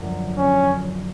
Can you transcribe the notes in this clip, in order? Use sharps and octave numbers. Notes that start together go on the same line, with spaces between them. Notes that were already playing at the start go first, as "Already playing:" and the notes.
Already playing: F#2 D3 F3 C4
C#4